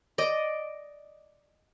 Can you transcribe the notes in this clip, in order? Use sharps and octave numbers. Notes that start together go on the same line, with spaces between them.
D5 D#5